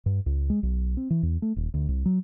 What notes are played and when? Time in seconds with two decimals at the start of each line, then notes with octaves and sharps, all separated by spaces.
0.06 G2
0.26 C#2
0.50 G#3
0.63 B1
0.97 C4
1.10 E3
1.23 E2
1.42 A3
1.56 D#1
1.74 D2
1.88 C2
2.05 F#3